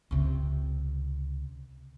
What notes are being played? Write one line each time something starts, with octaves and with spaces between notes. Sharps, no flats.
C#2 C3